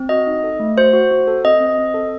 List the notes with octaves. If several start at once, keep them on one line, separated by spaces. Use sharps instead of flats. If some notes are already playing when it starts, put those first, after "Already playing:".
Already playing: C4
F#4 D#5
D#4
A4
A3
F#4 C5
F#4
F#4
A4
C4 D#5
C4
C4
A4